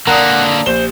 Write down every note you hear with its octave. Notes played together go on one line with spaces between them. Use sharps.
D3 A#3 A#4 D5 F#5 A5 D#6
A#1 G4 C5 E7 G7